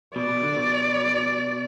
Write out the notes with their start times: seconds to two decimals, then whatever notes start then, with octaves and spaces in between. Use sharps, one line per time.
0.16 B2 D5
0.29 B2
0.43 D3
0.56 B2